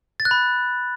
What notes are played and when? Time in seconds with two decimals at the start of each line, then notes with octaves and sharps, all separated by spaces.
0.20 A6
0.25 F#6
0.31 B5